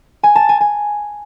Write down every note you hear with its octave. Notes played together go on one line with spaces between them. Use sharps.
G#5
A5
G#5
G#5